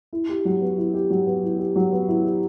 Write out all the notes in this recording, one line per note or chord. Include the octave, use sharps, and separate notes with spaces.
E4
G4
F#3
B3
E4
G4
F#3
B3
E4
G4
F#3
B3
E4
G4